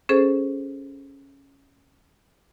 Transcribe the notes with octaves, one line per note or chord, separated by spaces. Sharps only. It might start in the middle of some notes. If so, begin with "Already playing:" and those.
C#4 G#4 A4 C5